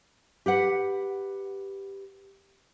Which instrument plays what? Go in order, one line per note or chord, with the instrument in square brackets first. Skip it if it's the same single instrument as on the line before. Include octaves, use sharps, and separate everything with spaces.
[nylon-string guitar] G4 B4 F#5